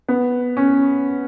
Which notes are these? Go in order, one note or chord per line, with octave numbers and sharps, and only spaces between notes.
B3
C#4